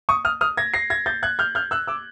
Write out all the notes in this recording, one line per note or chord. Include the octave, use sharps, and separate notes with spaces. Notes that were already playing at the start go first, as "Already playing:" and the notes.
C#6 D#6
D#6 F6
D#6 F6
G#6 A#6
A#6 C7
G#6 A#6
G6 A6
F#6 G#6
F6 G6
F6 G6
E6 F#6
D6 E6